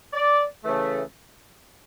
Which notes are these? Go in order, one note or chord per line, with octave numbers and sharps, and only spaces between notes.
D5
C#3 E3 A3